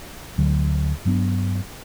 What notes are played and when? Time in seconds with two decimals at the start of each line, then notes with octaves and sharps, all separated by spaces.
0.38 D2 D3 F#3
1.05 G2 F#3 B3 D4